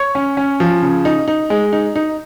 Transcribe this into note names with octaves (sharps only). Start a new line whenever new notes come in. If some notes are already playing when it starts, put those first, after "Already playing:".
Already playing: C#5 C#6
C#4
C#4
F3
C#3
D#4
D#4
G#3
D#4
D#4